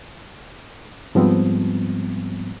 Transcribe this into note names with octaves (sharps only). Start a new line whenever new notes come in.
G#2 F3 G3 B3 C4